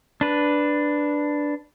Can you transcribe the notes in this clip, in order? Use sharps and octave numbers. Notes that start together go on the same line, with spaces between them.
D4 B4